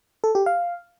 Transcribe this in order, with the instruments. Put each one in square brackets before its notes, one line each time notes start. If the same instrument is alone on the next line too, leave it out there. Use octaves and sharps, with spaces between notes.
[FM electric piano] A4
G4
F5